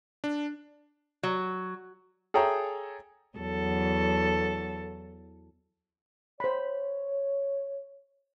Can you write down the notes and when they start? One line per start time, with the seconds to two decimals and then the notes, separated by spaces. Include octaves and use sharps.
0.24 D4
1.23 F#3
2.34 G#4 A4 C#5 E5 G5 A#5
3.38 E2 F#3 A4
6.40 C5 C#5 B5